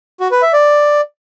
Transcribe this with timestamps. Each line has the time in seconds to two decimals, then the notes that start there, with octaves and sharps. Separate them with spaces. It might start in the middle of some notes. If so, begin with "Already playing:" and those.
0.20 F#4
0.31 B4
0.42 E5
0.53 D5